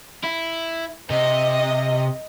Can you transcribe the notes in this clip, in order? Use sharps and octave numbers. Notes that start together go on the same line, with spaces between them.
E4
C3 D#5